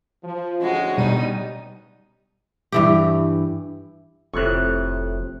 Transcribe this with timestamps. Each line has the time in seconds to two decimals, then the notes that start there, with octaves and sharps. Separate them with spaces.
0.24 F3
0.61 D2 A2 G#3 C#4 F#4
0.98 B2 G3 D#4 D#7
2.72 G2 E3 G4
4.34 F1 F2 A2 C3 C#6 F#6